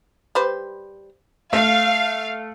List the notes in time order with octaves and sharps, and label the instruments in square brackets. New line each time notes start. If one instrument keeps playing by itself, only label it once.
[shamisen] G3 B4 C5
[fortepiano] A3 [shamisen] E5 [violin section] F5